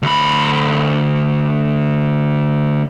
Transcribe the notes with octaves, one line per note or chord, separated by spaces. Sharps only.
D2 B5